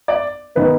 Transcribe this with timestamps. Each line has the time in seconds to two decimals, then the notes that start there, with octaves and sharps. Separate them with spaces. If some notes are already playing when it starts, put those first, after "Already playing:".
0.08 D5
0.55 D#3 B3 B4